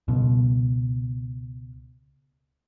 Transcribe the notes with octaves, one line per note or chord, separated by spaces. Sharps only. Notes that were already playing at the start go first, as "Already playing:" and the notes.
C#2 B2